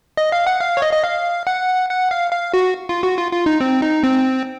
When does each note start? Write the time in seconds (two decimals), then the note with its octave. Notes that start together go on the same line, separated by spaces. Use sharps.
0.17 D#5
0.32 F5
0.47 F#5
0.60 F5
0.77 C#5
0.82 D#5
0.93 D#5
1.04 F5
1.47 F#5
1.89 F#5
2.11 F5
2.32 F5
2.54 F#4
2.89 F4
3.03 F#4
3.18 F4
3.32 F4
3.46 D#4
3.60 C4
3.82 D#4
4.04 C4